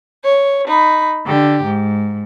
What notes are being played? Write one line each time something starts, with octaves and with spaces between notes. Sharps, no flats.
C#5
D#4 B5
D3 G4
G#2